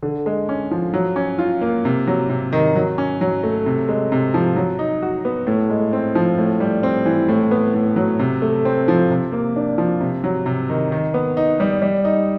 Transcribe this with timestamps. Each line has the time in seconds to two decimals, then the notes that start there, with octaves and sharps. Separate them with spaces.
0.03 D3
0.26 G#3
0.49 C#4
0.71 F3
0.94 F#3
1.16 C#4
1.39 F4
1.61 A#3
1.85 C3
2.07 F#3
2.29 C3
2.53 D#3
2.75 F#3
2.98 C#4
3.21 F#3
3.43 A3
3.66 C3
3.89 G#3
4.12 C3
4.34 F3
4.56 F#3
4.79 D#4
5.03 F#4
5.25 B3
5.47 A2
5.70 G#3
5.93 C4
6.15 F3
6.38 A2
6.60 G3
6.83 C4
7.06 E3
7.28 A2
7.51 B3
7.74 A2
7.96 F#3
8.19 C3
8.42 A3
8.65 C4
8.88 F3
9.11 C3
9.32 A#3
9.56 D4
9.78 F3
10.01 C3
10.24 F#3
10.46 C3
10.69 D#3
10.92 D#3
11.14 B3
11.37 D#4
11.60 G3
11.82 G3
12.05 D#4